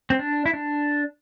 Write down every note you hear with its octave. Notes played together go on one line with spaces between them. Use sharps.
C4
D4
E4
D4